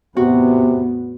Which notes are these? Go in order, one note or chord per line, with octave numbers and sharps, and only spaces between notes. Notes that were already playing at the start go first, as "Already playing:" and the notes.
E2 A2 C3 B3 F#4